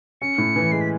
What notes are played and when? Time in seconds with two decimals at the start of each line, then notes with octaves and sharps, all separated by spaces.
0.22 C#4 C#7
0.38 A2
0.56 E3
0.72 G#3 C7
0.81 B6